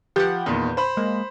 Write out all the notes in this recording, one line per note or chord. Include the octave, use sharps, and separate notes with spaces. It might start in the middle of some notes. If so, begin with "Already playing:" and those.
F3 G4 B4 F#5 G6
E2 A#2 D#3 B4
C5 B5
G#3 A#3